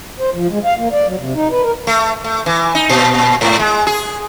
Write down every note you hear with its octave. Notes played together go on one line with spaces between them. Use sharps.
C5
F3
G#3
F5
A#3
D5
F#3
C3
D#4
B4
A#4
A3
A3
E3
D#4
A#2
G#2
G#3
G#4